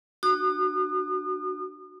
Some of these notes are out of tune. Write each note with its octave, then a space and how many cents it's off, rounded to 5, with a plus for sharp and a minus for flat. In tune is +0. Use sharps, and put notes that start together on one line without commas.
D4 +20 F#4 +0 D#6 -40